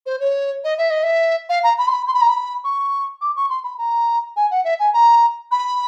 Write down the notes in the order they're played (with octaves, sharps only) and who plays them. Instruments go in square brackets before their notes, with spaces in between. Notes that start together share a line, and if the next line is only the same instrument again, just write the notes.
[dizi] C5
C#5
D#5
E5
D#5
E5
F5
A#5
B5
C6
B5
C6
B5
A#5
B5
C#6
D6
C#6
C6
B5
A#5
G#5
F#5
E5
G#5
A#5
B5